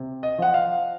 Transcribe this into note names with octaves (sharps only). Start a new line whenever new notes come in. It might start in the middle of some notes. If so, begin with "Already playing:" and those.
Already playing: C3
D#5
F3 F#5
F5